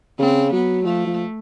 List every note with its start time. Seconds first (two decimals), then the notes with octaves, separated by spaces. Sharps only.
0.19 C#3 C4
0.52 F#3 B3
0.84 F3 A3
1.07 F3